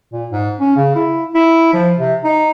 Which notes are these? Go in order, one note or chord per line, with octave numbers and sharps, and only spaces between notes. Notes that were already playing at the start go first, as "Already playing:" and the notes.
A#2
G#2
C#4
C#3
E4
E4
F3
C3
D#4